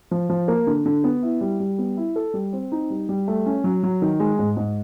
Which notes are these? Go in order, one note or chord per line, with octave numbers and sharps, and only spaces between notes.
F3
F3
A#3
D3
D3
B3
E4
G3
G3
B3
E4
A4
G3
C4
D#4
G3
G3
A3
C#4
F#3
F#3
D#3
G#3
G#2
G#2